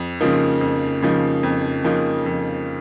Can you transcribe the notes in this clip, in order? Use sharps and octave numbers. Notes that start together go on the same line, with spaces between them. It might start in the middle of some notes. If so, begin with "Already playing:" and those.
Already playing: F2
C#3 F3 A#3 D#4
F2
C#3 F3 A#3 D#4
F2
C#3 F3 A#3 D#4
F2